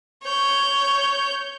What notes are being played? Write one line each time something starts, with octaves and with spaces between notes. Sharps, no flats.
C#5 G6